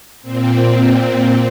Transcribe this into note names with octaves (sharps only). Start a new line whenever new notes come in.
A#2 C4